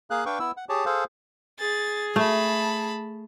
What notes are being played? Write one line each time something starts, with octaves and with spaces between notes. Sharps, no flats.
A#3 G#4 F5 F#6
D4 B4 F5 G5 C#6
B3 E4 E6
F#5
G4 G#4 C#5 A5
G#4 A4 C5 F5
G#4 A6
A3 A5 B5